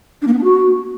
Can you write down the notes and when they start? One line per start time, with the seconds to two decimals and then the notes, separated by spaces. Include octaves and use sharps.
0.22 D4
0.27 A#3
0.33 B3
0.38 D4
0.43 F#4